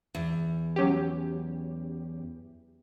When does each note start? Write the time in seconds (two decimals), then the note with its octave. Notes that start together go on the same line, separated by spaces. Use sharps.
0.15 E2
0.76 F#3 C#4 G4